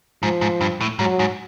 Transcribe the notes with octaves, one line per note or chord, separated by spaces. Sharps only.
G#2 F3
G#2
G2
A2
G#2 F#3
G#2